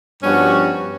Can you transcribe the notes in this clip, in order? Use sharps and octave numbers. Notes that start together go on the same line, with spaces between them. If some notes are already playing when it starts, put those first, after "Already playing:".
G2 F3 G3 B3 C#4 F#4